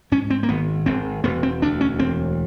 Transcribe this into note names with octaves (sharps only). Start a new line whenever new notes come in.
G#2 C#4
C4
A#3
G#1 B3
G#1 C4
E1 B3
C4
D2 D4
C#4
E1 C4